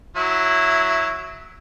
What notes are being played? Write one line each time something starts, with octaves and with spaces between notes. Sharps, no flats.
F#3 E4